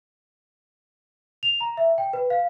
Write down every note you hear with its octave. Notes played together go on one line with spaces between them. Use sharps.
F7
A#5
E5
G5
B4
F5